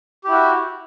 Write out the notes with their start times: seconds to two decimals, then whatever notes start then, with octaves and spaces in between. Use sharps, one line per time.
0.24 G4
0.28 E4
0.32 F#4